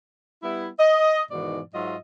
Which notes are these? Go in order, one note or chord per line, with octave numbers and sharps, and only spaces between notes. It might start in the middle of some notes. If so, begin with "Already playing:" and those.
G3 B3 E4
D#5
G#2 B2 D#3 E3 D5
G#2 F#3 F4 D#5 E5